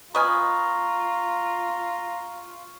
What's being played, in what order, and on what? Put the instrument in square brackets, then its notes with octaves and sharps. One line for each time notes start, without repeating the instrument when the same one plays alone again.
[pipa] B3 D#5 G#5 [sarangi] F4 [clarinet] A#5 [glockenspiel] C#6 F6